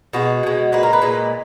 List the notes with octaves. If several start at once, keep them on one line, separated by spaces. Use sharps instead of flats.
B2 G#3 F#4
B2 G#3
A#2 G#3 B4
A#4
B4
A#2 G#3